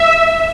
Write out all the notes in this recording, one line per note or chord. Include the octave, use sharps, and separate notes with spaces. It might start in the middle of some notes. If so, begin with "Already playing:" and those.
Already playing: E5